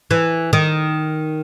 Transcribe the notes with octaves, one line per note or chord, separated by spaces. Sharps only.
E3
D#3